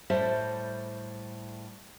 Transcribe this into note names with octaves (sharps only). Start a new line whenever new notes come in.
A2 G3 C5 E5 A5